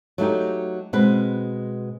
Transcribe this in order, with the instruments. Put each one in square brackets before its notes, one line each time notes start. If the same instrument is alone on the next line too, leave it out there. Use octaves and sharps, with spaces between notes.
[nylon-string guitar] F#3 A3 D#4 G4
B2 G#3 C4 B4